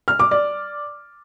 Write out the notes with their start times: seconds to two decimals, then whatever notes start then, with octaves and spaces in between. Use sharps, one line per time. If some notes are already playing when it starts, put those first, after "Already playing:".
0.08 F6
0.20 D6
0.31 D5